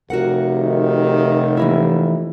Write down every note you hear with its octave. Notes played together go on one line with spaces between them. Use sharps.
F1 C3 F#4 A#4 F#5
D#3
E3 A#3 E4